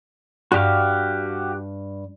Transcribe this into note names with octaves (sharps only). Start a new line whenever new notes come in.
G2 F#4 G4 F5